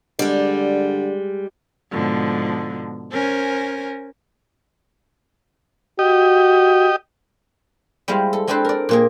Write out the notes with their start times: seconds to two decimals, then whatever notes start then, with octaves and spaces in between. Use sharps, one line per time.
0.19 D3 G3 G#3
1.91 G#2 B2 D3 F3
3.11 C#4 A#4 C5 G#5
5.99 F#4 G4 D#5
8.08 G3 G#3 E4 C5 F5
8.33 A4
8.47 G#3 C4 D4 A4 B4 C5
8.65 A#4 D5
8.89 A#2 A#3 G#4